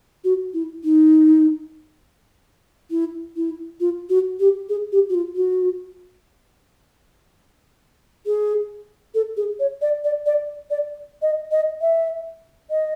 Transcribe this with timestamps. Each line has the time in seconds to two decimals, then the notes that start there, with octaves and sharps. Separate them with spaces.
0.24 F#4
0.54 E4
0.84 D#4
2.91 E4
3.36 E4
3.80 F4
4.09 F#4
4.40 G4
4.69 G#4
4.92 G4
5.10 F#4
5.14 F4
5.36 F#4
8.26 G#4
9.15 A4
9.37 G#4
9.60 C#5
9.81 D5
10.04 D5
10.26 D5
10.70 D5
11.22 D#5
11.51 D#5
11.81 E5
12.71 D#5